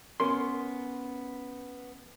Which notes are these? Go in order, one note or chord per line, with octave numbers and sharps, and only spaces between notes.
B3 C#4 A#4 C6